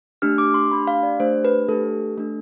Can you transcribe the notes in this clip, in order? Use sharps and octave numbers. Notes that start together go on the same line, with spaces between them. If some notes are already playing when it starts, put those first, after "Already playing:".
A3 D4 G4 F6
D6
C6
A3 D4 G4 B5
F5
D5
A3 D4 G4 C5
B4
A3 D4 G4 A4
A3 D4 A4